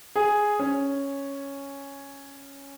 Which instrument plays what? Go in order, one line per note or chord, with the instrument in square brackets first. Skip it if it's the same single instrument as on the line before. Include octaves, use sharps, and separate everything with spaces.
[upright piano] G#4
C#4